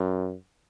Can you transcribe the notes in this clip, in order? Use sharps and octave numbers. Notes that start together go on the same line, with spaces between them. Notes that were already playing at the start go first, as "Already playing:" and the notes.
Already playing: F#2